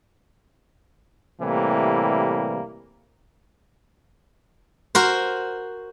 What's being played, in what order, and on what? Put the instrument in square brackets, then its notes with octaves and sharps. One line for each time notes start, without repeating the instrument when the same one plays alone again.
[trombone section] A2 C3 E3 G3 A#3
[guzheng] F#4 A#4 C5